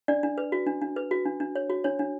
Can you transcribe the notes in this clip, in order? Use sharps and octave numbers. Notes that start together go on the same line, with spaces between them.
D4 D5
D4
B4
F#4
D4
D4
B4
F#4
D4
D4
C#5
F#4
D4 C#5
D4